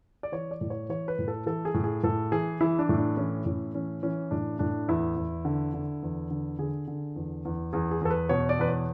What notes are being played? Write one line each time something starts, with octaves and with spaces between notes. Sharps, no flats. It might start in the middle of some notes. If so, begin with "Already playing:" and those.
D5
E3 C#5
D5
A2
C#5
E3 C#5
B4
A2
A4
E3 A4
G#4
A2
G#4
A2 A4
E3 G#4
E3 E4
D4
A2
D4
E3 C#4
A2 C#4
E3 C#4
E3 C#4
A2 D4
A2 D4
E2 E4
E2
D3
D3
E2
D3
D3 G#4
D3
E2
E2
E2 G#4
G#4
E2 A4
B4
B2 C#5
D5
E2 B4
C#5